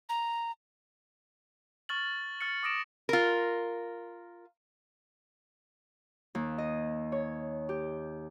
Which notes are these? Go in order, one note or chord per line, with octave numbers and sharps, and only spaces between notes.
A#5
C#6 F6 A6 F#7
F6 A6 C#7
D6 D#6 A#6 D7 E7
F4 A#4
D#2
D#5
C#5
G4